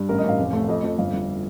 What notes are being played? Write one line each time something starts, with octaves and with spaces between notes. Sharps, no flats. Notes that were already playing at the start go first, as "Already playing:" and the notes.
Already playing: G2
A1 A#4
D#5
A1 F5
F1
A3
F2 D#5
F2
G1 F5
G1